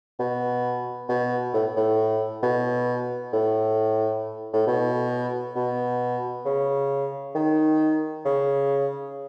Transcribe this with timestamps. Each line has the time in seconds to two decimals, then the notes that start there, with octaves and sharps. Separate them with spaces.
0.20 B2
1.09 B2
1.54 A2
1.77 A2
2.43 B2
3.33 A2
4.54 A2
4.67 B2
5.56 B2
6.45 C#3
7.35 D#3
8.25 C#3